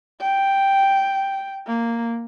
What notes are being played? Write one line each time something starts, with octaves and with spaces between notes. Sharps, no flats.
G5
A#3